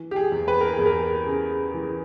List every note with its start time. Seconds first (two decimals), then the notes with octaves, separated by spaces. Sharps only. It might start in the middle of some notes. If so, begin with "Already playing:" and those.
Already playing: E3
0.11 G4
0.16 G#4
0.32 E2
0.48 B4
0.61 A#4
0.73 G#4
0.79 E2
0.86 A#4
1.27 C#3
1.74 E3